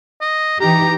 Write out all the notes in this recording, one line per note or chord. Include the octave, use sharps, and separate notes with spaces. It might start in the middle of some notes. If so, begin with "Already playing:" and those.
D#5
E3 D#4 G4 A#5